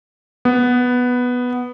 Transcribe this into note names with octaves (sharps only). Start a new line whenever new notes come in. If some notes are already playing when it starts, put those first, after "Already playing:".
B3